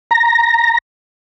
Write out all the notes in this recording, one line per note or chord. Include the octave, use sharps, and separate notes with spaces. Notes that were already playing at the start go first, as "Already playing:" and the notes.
A#5